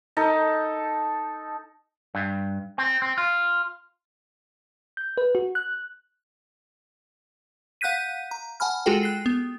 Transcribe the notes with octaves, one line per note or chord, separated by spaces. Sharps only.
D#4 A4
G2
C4
C4
F4
G6
B4
F#4
F#6
F5 F#5 F#6 G6 B6 D#7
A#5
F#5 G#5 A5 B5 F6
G#3 F4 F#4 G#4 A4 G5
F#6 C7
B3